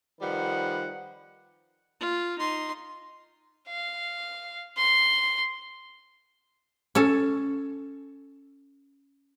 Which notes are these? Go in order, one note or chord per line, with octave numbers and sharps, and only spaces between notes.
D#3 F3 G3 B4 F#5
F4
D#4 C6
F5
C6
C#4 A4